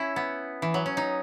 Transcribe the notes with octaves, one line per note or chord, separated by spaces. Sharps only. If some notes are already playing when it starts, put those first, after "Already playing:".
Already playing: C#4 E4
B3
E3
F#3
C#4
D#4